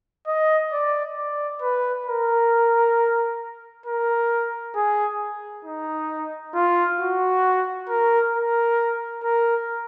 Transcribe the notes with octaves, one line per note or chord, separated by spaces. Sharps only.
D#5
D5
D5
B4
A#4
A#4
G#4
D#4
F4
F#4
A#4
A#4
A#4